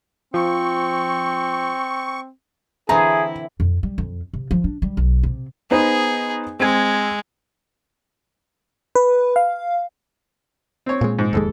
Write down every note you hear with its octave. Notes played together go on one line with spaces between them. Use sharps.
F3 C4 C#6
D3 E3 C4 E4 G#4 A#5
F2
G3
F2
C3
F3
D4
G3
B1
C3
B3 D#4 G#4 C5
G#3 C4 G#6
B4
F5
C4 C#5
A#2 G#3
G#2
F1 D#2 G#3 A4